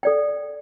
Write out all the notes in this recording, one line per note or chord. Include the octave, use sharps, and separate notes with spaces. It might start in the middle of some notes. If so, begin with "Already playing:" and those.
A4 D5 G5